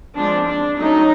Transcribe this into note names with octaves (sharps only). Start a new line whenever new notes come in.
F3 G#3 C4 D4
D4
F#3 A3 C#4 D#4